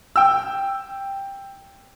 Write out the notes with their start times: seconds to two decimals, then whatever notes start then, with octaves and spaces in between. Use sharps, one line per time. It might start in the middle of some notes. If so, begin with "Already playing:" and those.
0.16 G5 E6